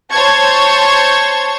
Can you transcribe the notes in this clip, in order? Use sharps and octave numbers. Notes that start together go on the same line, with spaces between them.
C5 C#5 A5 C#6 G#6